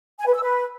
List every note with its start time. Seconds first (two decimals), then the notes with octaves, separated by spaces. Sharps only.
0.19 G#5
0.27 B4
0.35 E6
0.42 B4